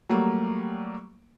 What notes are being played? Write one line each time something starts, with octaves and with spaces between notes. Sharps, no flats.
F#3 G3 A3 A#3